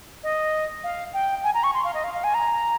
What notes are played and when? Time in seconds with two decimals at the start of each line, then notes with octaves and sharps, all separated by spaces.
0.23 D#5
0.84 F5
1.14 G5
1.44 G#5
1.54 A#5
1.64 C#6
1.74 C6
1.84 F5
1.94 D#5
2.04 F5
2.14 F5
2.24 G#5
2.34 A#5